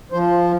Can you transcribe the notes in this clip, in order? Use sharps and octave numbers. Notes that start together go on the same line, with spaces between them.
F3 C5